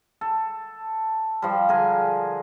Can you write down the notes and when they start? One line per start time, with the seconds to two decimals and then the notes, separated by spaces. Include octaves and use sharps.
0.21 A4
1.42 F3 G3
1.69 D3 G#4 A#4 G#5